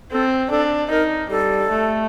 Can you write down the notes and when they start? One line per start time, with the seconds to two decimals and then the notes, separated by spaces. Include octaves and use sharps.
0.11 C4 A4
0.50 D4 A4
0.90 D#4 A#4
1.30 G3 A4
1.70 A3